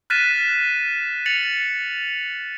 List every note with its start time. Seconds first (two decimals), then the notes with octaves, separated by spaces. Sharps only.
0.10 F6 F#6 A6 B6 D#7 E7
1.26 A6 C#7 F7 F#7